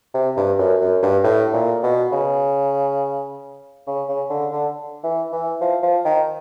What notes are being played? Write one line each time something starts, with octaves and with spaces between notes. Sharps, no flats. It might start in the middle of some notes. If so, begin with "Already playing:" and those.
C3
G2
F#2
F#2
G2
A2
A#2
B2
C#3
C#3
C#3
D3
D3
E3
E3
F3
F3
D#3